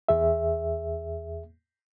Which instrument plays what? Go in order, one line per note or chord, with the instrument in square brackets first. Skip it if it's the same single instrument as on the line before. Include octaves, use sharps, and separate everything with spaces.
[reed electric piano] E2 G#4 E5